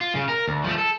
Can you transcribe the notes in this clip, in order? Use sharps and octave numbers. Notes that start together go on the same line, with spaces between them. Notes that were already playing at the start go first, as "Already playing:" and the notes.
F4
C#3
A#4
D2
F3 A3
A4